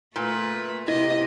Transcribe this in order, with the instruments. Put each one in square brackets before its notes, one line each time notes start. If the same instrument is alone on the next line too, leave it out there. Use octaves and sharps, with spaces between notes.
[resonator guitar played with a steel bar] A#2 [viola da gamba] A3 B4
[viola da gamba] C3 G4 [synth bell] E4 [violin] D#5